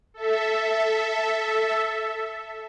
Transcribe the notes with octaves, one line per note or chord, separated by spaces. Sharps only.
A4 E5